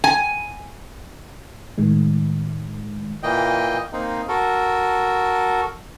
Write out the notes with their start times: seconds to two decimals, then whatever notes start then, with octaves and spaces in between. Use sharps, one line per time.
0.04 G#5
1.78 A2 D#3 G#3
3.23 A#2 E3 A#3 D#5 G5
3.93 A#3 C4 D#4
4.28 F#4 A4 A#4